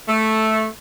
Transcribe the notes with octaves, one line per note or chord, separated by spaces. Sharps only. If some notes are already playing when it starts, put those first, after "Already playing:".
A3